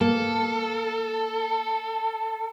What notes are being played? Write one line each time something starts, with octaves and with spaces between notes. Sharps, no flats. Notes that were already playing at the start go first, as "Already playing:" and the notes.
A#3 A4